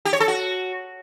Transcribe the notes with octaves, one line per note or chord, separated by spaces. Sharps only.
G4
C#5
A4
F#4